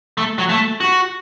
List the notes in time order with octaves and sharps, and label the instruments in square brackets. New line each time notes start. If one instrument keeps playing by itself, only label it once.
[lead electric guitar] A3
F#3
A3
F#4